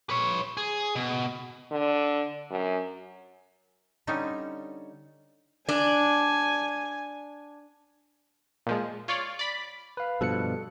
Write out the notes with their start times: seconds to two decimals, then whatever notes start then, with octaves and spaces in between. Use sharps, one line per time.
0.10 B4 C#5
0.57 G#4
0.95 B2
1.72 D3
2.51 F#2
4.07 D3 G3 C#4 D#4 A4 G#5
5.69 D4 G#5
8.67 A#2 F3 G#3
9.08 F4 C#5 D5
9.39 D5 B5 B6
9.97 B4 F5
10.21 G2 B2 F3 A4 F#6 C#7